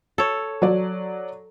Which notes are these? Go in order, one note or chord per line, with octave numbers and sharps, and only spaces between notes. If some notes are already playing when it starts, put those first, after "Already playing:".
A4 C#5
F#3 D5